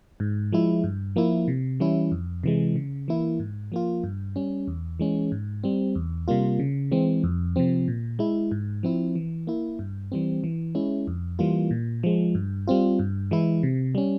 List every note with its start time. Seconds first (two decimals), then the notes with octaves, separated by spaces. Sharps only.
0.20 G#2
0.52 F3 G#3 E4
0.84 G2
1.16 F3 A#3 E4
1.48 C3
1.80 E3 G3 C#4 E4
2.12 F2
2.43 C3 E3 G#3
2.76 C#3
3.08 E3 A#3 E4
3.40 G#2
3.72 F3 A#3 F4
4.04 G2
4.36 G3 C#4
4.68 E2
4.99 E3 G#3 C#4
5.32 G#2
5.64 G3 C4
5.95 E2
6.28 C3 G3 A#3 F4
6.59 C#3
6.91 E3 G#3 C4
7.24 F2
7.56 C3 F3 C4
7.88 A#2
8.19 G#3 E4
8.51 G#2
8.83 F3 C4 E4
9.16 E3
9.47 A#3 E4
9.79 G2
10.12 E3 G3 C4
10.44 E3
10.75 G#3 C#4 E4
11.07 F2
11.39 E3 G3 A#3 F4
11.71 A#2
12.03 F3 G#3
12.35 G2
12.67 G3 C4 F4
12.99 G2
13.31 E3 G#3 E4
13.63 C3
13.95 G3 C#4